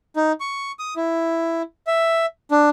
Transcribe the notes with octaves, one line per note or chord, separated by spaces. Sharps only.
D#4
C#6
D#6
E4
E5
D4